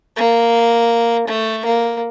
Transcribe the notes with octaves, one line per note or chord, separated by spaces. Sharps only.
A#3
A3
A#3